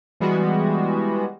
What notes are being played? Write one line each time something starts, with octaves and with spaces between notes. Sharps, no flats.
E3 G3 G#3 B3 F#4